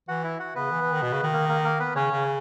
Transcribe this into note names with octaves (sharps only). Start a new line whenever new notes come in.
E3 F#4 F#5
E4 E5
F#4 F#5
C#3 B3 B4
E3
E3
D#3
B2
C#3
D#3
A#3 A#4
A#3 A#4
A#3 A#4
B3 B4
C#3 C#4 C#5
C#3